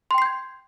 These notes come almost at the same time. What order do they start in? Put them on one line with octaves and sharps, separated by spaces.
C6 G5 C7 G6 G#6